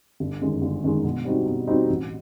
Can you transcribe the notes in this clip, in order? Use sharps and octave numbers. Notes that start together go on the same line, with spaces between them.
G1
F#2 D#3 G#3
G1
F#2 D#3 G#3
B2
G3 C4 D#4 F#4
B2
G3 C4 D#4 F#4
A1